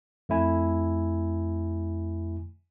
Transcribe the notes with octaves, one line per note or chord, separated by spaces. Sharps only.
F2 A3 E4 G#5